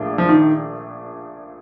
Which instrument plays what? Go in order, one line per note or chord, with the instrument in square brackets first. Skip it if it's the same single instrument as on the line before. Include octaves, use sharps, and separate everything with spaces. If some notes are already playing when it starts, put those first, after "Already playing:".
Already playing: [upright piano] A#1 A#2 A3 D4
[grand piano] F3
D#3